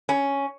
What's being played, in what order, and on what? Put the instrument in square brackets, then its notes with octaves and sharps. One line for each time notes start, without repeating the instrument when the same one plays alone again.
[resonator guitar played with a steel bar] C#4